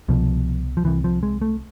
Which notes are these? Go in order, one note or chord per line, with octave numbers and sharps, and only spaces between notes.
C2 B2 F3
F3
C2 C3 E3
F3
G#3
A3